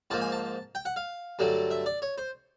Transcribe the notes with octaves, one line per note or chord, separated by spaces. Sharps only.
G#2 F3 A#3 A5
G#5
A5
G5
F#5
F5
G2 D3 F#3 A3
E5
D5
C#5
C5